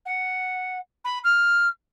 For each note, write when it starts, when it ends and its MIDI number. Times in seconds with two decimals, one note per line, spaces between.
0.06 0.78 78
1.05 1.19 83
1.24 1.68 89